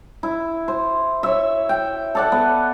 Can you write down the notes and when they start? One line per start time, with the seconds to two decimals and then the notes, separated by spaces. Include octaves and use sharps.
0.23 E4
0.68 C5
1.23 C#5 E5
1.69 G5
2.15 A4 D5 F#5
2.32 B3